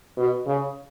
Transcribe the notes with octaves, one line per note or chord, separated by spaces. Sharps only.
B2
C#3